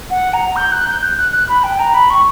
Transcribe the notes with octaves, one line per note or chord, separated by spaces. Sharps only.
F#5
A#5
G6
F#6
G6
F#6
F#6
F#6
B5
G5
A#5
B5
C#6